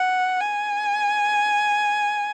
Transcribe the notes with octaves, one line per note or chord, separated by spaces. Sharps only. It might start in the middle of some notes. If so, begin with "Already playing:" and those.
Already playing: F#5
G#5